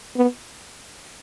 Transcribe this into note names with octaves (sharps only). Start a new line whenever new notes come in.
B3